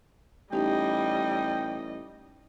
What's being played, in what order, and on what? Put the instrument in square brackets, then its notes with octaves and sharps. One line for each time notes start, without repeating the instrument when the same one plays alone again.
[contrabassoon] A1 [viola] G3 D#5 [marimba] D#4 G4 [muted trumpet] G5